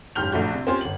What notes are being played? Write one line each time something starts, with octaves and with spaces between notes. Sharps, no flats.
F#1 G#2 G4 F6 G6 F7
A#1 A3 F#4 G6
C3
C4 C#4 F4 G4 A#4 C5
G1 F#7